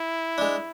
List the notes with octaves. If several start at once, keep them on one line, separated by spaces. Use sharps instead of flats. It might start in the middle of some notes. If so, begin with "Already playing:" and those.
Already playing: E4
G#3 D4